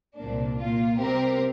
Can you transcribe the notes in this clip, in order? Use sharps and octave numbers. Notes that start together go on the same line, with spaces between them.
C2 A#2 A#3 D4
A#2 A#3 F4
C3 G3 C4 G4 A#4